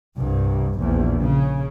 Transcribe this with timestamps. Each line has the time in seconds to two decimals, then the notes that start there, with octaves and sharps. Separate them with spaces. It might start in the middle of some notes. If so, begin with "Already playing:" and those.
0.17 C2 G2
0.79 A#1 E2
1.21 C#3